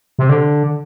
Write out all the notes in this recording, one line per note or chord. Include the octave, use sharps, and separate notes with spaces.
C3
D3